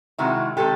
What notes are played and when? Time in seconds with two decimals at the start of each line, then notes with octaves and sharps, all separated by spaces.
0.18 C3 D#3 G#3 E4 F#4
0.57 C3 D#3 G#3 G4 A4